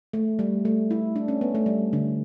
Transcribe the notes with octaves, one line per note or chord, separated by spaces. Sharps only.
A3
G3
A3
E4
D4
C#4
B3
A3
G3
D3